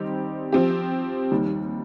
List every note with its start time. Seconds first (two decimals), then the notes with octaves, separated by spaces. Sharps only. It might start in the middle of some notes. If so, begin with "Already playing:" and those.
Already playing: D#3 G3 C4 D#4 G4
0.52 F3 C4 G4
1.32 D#2 D#3 G3